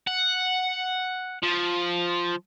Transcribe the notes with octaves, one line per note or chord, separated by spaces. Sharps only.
F#5
F3